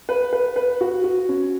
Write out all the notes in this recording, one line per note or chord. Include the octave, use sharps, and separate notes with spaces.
B4
B4
B4
F#4
F#4
C#4